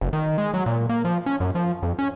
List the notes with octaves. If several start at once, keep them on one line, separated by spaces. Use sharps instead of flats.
F#1
D#3
G#3
F#3
A#2
A#3
F3
C#4
F#2
F3
F2
C#4